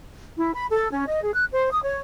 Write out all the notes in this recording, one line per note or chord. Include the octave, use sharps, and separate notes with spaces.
E4
B5
A4
C#4
D#5
G#4
F#6
C5
D#6
C#5